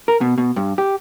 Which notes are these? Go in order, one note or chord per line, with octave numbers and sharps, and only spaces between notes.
A#4
B2
B2
G2
G4